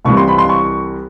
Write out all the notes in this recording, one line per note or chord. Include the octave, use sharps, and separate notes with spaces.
C2 C3 E3 G3 C#6
C6
B5
C6
C#6